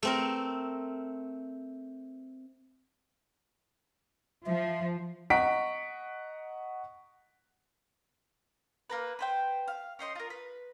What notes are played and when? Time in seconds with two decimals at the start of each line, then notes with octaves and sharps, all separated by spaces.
0.03 A3 C4 A#4
4.46 F3 E5
5.30 D#5 F#5 A#5 C#6 B6 D7
8.90 A#3 A#4 B4
9.19 B4 C5 G5
9.68 F5
9.99 C#4 C5 D#5 C6
10.15 F4 A#4
10.30 B4